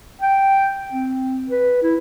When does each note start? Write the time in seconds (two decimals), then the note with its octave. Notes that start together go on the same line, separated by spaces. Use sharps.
0.22 G5
0.92 C4
1.50 B4
1.82 E4